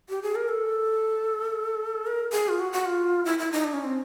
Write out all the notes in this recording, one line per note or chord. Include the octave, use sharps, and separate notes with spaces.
G4
G#4
A#4
A4
A#4
G#4
F4
F#4
F#4
F4
E4
E4
D#4
D4
C#4
C4